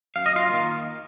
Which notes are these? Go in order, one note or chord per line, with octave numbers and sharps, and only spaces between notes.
F#2 F5
D#5
F4 F5
D#3 A#3